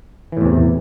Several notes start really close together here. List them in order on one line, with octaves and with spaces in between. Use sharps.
E3 A2 E2 C3